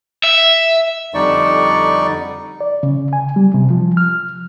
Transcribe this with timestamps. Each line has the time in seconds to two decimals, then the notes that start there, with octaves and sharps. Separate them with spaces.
0.24 E5
1.14 F2 D3 G3 D#4 D5 C#6
2.61 D5
2.83 C#3
3.13 G#5
3.36 G3
3.54 C3
3.70 F3
3.97 F6